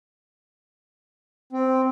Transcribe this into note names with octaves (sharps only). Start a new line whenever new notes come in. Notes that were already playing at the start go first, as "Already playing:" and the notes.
C4